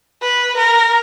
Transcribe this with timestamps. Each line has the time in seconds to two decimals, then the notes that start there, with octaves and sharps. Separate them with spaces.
0.22 B4
0.57 A#4